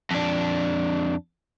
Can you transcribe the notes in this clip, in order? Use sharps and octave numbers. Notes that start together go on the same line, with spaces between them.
F2 D4